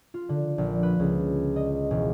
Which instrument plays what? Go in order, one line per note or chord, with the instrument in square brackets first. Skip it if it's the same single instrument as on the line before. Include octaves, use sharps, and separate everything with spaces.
[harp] F4
D3
A#1
B4
C#2
D#5
E1